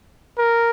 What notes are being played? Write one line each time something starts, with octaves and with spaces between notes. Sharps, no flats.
A#4